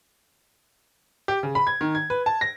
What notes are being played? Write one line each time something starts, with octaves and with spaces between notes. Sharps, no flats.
G4
C#3
B5
G#6
D#3
G#6
B4
A5
A#6